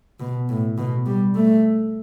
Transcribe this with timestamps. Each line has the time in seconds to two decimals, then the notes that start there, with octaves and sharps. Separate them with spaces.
0.20 B2
0.49 A2
0.78 B2
1.06 G3
1.35 A3